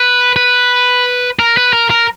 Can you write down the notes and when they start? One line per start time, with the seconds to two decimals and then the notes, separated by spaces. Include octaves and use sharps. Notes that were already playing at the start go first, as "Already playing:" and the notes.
Already playing: B4
0.36 B4
1.39 A#4
1.57 B4
1.73 A#4
1.90 A#4